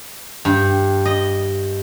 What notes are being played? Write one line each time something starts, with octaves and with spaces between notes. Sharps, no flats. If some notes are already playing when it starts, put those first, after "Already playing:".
G2
D#5